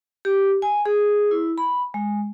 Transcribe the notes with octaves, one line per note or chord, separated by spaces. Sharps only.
G4
G#5
G#4
E4
B5
G#3